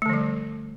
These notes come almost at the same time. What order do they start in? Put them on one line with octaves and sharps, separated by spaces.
A3 D3 F3 G3